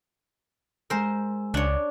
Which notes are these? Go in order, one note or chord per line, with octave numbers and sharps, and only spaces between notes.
G#3 A#4 C5 G#5 E6
C#2 D4 C#5